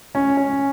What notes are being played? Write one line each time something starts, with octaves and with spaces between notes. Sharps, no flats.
C#4
C#4